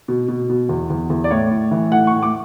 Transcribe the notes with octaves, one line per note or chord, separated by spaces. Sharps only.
B2
B2
B2
E2
E2
E2
D5
A2 C#5
A2
E3
A2 F#5
A2 C#6
D6